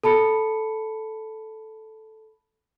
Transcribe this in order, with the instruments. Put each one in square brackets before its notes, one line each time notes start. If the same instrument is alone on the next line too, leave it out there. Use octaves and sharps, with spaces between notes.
[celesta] A4 A5 B5 C#7